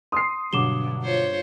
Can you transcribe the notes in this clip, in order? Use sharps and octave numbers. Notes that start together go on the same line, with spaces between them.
C6 D#6 C7
G2 B2 D3 F#3 D6 E7 G7
F4 C5 C#5